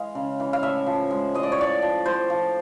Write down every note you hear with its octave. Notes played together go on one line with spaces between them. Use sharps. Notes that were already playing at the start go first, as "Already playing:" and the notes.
Already playing: E3 G#3 F5
C#3
E3
F5
A2 E5
F3
G#3
A2 D#5
D5
C#5
A2 D5
F3
A2 C5
F3